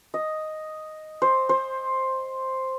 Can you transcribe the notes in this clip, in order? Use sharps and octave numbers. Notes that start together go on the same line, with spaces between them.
D#5
C5
C5